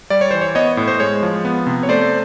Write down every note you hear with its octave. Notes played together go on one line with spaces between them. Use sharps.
G3 D5
C#5
E3 C5
C#5
B3 C#5 D#5
A2
C5
G#3 C#5
F3
B3
C3
C#5
A3 C5 D5